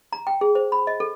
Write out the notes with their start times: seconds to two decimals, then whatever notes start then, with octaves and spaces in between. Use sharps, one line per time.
0.13 A#5
0.27 G5
0.41 G#4
0.55 C5
0.72 B5
0.87 D#5
1.00 A4